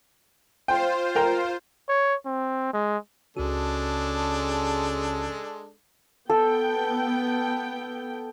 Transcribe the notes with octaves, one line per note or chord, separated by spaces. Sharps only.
F4 C5 G5
A#4 G5 A#5
C#5
C4
G#3
C#2 C#3 G#3 D4 F#4 A4
B3 A4 G5